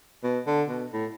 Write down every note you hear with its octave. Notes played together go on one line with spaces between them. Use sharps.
B2
D3
B2
A2